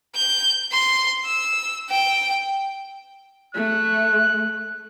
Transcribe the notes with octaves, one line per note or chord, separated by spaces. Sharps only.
G6
C6
E6
G5
A3 F#6